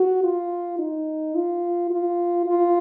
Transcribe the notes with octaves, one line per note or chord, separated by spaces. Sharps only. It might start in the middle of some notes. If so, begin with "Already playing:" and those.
Already playing: F#4
F4
D#4
F4
F4
F4